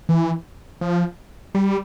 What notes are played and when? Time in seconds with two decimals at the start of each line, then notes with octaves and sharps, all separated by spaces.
0.09 E3
0.81 F3
1.55 G3